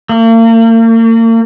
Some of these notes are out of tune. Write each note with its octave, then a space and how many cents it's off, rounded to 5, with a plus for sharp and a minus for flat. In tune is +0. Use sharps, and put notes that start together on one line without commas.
A#3 -40